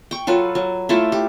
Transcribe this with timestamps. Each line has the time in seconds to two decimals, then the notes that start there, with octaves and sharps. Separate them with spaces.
0.11 G5 C#6
0.27 F#3 F4 A4 B4
0.55 F#3
0.89 A3 E4 F4 A4
1.12 G4